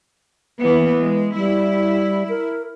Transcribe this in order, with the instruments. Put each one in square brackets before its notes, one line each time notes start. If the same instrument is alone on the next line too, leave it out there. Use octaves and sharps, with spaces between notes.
[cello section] E3 A#3 B3
G#3
[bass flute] G3 [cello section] E4
[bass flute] A#4